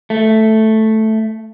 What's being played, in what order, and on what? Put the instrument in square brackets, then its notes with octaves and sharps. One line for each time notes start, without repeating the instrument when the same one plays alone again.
[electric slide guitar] A3